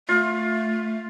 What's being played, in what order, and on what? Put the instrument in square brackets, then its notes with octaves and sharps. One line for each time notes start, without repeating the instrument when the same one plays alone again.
[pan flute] A3 [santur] F4